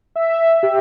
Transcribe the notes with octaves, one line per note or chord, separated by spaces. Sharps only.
E5
G4